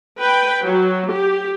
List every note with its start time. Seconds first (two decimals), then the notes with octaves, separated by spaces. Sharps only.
0.22 B4 G5
0.65 F#3
1.14 G4